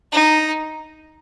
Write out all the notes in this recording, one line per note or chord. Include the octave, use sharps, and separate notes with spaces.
D#4